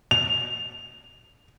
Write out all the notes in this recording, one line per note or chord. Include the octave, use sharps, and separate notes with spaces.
F7